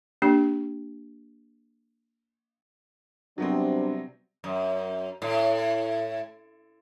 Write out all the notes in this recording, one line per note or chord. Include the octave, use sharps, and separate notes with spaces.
A#3 D4 G4
C3 F#3 G3 B3 C4 D4
F#2
A2